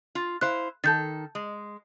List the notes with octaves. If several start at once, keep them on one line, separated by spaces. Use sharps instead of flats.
F4
E4 C5 F5 F#6
D#3 A4 A5 G6 A6
G#3